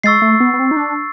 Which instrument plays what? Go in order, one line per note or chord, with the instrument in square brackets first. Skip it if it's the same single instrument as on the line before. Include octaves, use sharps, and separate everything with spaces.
[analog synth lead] G#3 [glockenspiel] C#6 E6 A6 C7
[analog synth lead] A3
B3
B3
C4
D#4
D4